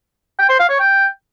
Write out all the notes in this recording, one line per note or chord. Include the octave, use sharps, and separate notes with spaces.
G5
C5
F5
C#5
G5